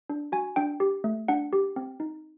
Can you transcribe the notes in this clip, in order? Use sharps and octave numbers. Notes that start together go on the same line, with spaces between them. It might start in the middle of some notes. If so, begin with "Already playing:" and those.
D4
F#4 G#5
D4 G5
G4
A3
D4 F#5
G4
C4
D#4